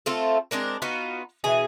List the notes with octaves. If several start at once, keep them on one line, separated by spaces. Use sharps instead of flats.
A3 C4 F4 A4
G#3 C4 D4 A#4
B3 D#4 F4 F#4
B2 E3 G#4